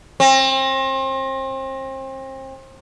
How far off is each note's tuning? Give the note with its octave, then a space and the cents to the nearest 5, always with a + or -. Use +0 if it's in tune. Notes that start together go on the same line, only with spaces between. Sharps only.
C4 +35